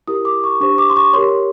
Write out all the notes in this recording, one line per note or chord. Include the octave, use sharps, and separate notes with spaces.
E4 G4 A#4 D#6
D6
C#6
D4 G4 C5 C#6
D6
C6
C#6
G4 A#4 C#5 C6